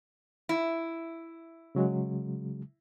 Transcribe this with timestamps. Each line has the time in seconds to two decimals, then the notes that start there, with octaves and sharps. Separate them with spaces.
0.49 E4
1.75 C#3 F#3 G#3